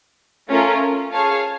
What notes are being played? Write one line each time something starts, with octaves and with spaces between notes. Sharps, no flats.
A3 C#4 F4 A#4
G#4 C#5 F5 A5